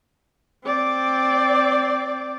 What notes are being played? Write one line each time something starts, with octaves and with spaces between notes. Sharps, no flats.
C4 D5